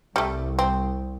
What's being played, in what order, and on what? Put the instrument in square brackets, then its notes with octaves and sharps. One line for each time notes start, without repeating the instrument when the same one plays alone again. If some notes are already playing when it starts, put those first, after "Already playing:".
[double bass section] C2 [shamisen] G3 A3
[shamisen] C4